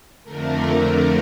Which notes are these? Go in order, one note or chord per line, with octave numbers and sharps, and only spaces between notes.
F2 D3 A3 A#4